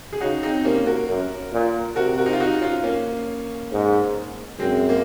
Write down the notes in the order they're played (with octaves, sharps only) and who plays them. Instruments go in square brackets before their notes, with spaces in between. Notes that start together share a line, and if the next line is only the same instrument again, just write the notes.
[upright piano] G#4
[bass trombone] C#3 [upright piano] D#4 F#4
[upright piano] C4 D#4
[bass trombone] C3 [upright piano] A#3 C#4
[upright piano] F#4 A#4
[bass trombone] F#2
A#2
[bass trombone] C3 [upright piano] F#4 A#4
[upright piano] F#4 A#4
D#4
F4
D#4 F#4
C#4 F4
A#3 C#4
[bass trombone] G#2
[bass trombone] F#2 [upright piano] G#3 C4
[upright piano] A#3